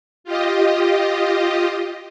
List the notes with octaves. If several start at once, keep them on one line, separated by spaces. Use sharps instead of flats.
F4 G4 D#5